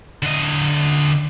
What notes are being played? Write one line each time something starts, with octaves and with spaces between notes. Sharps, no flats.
D3 D#5